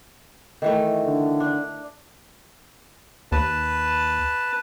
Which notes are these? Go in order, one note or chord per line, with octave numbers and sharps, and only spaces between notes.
D#3 E3 A3
D3
D4
D#2 B4 A5